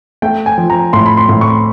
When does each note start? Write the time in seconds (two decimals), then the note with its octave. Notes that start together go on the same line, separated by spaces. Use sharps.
0.22 A3 G5
0.46 G#5
0.58 F3
0.70 A#5
0.93 A2 C6
1.06 B5
1.17 C6
1.29 A2
1.41 C#6